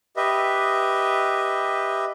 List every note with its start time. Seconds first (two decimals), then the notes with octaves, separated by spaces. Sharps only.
0.17 G4 B4 D#5 E5